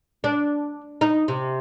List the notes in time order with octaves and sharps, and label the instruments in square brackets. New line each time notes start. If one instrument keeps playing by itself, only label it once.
[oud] D4
D#4
C3